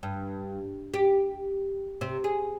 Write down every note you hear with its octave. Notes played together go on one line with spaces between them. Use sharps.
G2
G4
C3
G#4